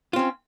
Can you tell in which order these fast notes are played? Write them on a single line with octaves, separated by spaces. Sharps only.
F4 C4 C#4